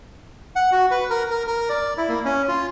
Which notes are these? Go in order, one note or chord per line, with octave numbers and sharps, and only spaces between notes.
F#5
F#4
B4
A#4
A#4
A#4
D5
E4
A#3
C#4
F4